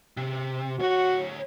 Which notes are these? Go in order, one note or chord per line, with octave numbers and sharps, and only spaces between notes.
C3
D2 F#4 C#5